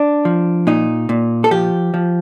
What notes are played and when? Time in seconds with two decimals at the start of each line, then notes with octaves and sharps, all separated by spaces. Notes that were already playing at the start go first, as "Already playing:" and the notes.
Already playing: D4
0.25 F3
0.67 A#2 D#4
1.09 A#2
1.44 A4
1.51 F3 G4
1.94 F3